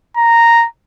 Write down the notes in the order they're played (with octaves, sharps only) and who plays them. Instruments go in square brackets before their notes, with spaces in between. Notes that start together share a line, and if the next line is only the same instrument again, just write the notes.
[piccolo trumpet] A#5